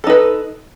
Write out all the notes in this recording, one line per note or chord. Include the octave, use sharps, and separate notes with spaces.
D#4 A4 B4